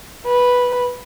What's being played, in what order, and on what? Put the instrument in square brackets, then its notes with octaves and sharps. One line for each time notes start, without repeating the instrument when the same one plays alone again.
[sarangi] B4